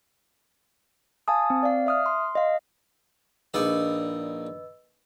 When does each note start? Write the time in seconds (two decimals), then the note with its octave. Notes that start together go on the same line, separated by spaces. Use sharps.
1.28 F5 G#5 A5 D#6
1.50 C4
1.63 D5 F5
1.86 E5 D#6 F6
2.06 C6
2.35 D#5 F5
3.54 A#1 D#4 B4 D5 D#5 E6